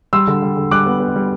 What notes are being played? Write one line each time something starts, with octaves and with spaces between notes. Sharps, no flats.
G3 C6 E6
D3
G3
D3
G3 D6 F#6
B3
B3
G3